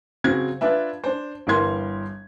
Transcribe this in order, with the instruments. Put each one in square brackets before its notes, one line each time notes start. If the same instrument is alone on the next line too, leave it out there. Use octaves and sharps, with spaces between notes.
[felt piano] C#3 F#3 C4 G#6
D4 F4 B4 E5
D4 C5
G1 E3 G3 A#4 C6 G#6